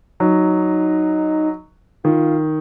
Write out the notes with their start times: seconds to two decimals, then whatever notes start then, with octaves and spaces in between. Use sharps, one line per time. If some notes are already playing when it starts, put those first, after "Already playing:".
0.20 F#3 D#4
2.04 D#3 F4